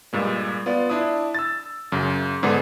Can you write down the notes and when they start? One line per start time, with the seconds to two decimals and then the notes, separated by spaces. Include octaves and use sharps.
0.13 G2 A#2 G#3
0.66 B3 F4 D5
0.90 D4 E4 D#6
1.34 E6 A6
1.92 F#2 C#3
2.43 G#2 D3 B3 G#4